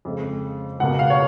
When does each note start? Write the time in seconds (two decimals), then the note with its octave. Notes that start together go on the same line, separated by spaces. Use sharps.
0.05 F2 C#3 G#3
0.80 C#2 B2 A#3 F#5
0.99 F5
1.10 C#5